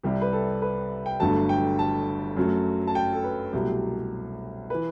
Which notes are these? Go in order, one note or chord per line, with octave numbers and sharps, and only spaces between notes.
C2 C3 G3 G4
B4
A4
B4
G5
G1 G2 F#3 A3 A5
G5
A5
F#2 F#3 A3
A5
G5
A4
B4
C2 B2 F#3 A3 G4
E3 B4